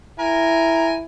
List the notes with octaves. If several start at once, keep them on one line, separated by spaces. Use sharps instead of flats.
E4 A#4 G#5